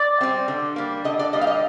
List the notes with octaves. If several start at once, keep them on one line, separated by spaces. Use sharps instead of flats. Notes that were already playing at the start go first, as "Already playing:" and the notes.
Already playing: D5
G3 C4
D3
G3 A#3
D3 D#5
D5
G3 A#3 D#5
F5
D#5